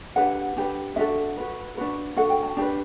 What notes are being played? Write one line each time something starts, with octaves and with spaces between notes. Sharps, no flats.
D4 G4 B4 F#5
D4 G4 B4
D4 F#4 A4 E5
F#4 B4
D4 F#4 B4
D4 F#4 A4 F#5
G5
A5
D4 G4 B4